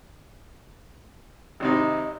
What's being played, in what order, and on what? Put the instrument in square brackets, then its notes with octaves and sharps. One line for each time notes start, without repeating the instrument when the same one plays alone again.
[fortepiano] G#1 C3 D#4 [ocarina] D#5